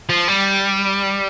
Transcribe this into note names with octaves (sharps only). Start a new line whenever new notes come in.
F3
G3